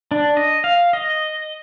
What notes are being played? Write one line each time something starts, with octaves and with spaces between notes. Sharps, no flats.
D4
D#5
F5
D#5